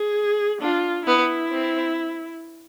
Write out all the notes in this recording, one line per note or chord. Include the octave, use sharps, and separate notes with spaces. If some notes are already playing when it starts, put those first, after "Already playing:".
Already playing: G#4
D4 F4
B3 E4
C4